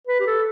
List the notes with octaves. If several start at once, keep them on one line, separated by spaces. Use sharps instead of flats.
B4
G4
A4